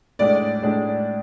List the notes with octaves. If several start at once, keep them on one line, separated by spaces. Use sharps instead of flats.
A2 G#3 D4 D5
A2 G#3 D4